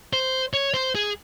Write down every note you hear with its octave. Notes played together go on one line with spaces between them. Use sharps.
C5
C#5
C5
G#4